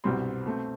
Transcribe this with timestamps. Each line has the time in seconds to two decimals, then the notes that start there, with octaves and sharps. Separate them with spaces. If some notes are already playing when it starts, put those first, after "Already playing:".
0.04 C2 B2 G3 C4 C6
0.46 B2 A3 C4